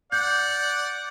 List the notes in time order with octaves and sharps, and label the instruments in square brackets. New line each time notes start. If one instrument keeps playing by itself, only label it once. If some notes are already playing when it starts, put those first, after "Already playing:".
[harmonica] D5 F#5 [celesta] G6